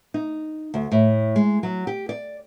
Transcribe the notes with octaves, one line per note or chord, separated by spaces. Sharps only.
D#4
D2
A2
G#3
F#3
G4
D5